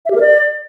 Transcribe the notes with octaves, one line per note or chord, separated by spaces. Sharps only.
E5
G4
A#4
D5